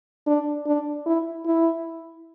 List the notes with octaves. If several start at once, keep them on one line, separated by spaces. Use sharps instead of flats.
D4
D4
E4
E4